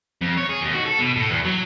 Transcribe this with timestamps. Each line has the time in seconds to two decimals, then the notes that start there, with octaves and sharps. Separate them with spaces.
0.21 F2
0.37 C#5
0.49 G#4
0.61 D#2
0.73 F#4
0.85 A4
0.99 B2
1.16 A2
1.30 E2
1.44 F#3